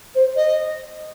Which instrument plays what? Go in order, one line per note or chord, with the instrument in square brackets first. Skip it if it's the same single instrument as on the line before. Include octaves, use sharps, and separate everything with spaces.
[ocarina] C5
[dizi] D#5